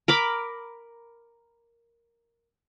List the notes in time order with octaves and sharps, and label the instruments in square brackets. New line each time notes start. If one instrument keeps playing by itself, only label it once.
[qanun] A#4 B5 D6